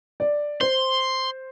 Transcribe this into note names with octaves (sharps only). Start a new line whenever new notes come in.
D5
C5 C6